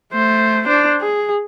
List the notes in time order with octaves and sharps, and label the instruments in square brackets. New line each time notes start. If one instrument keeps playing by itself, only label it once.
[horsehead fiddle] A3 C5
D4 C5
G#4